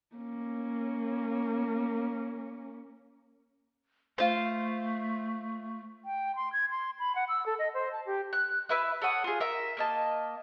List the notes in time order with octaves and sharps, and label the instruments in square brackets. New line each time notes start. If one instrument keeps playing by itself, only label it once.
[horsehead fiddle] A#3 C#4
[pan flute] A3 [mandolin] F4 C5
[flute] G5
C6
G#6
C6
B5
F#5
E6
A4
D#5
C5
A5
G4
[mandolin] F#6
E4 B4 E5 F#6
A4 C#5 F#5 D#6
F4 G#4
A#4 E5
A#3 D#5 A5